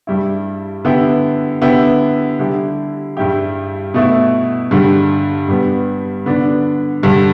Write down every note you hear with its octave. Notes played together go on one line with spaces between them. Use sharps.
G2 G3 E4
D3 B3 E4 G4
D3 B3 E4 G4
D3 G3 E4 G4
G2 G3 E4 G4
B2 A3 E4
G2 D3 G3
G2 G3 B3
D3 B3 D4
G2 D3 G3